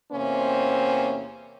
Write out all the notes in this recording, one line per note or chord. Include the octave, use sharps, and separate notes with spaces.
E2 C3 A#3 C4 C#4 C5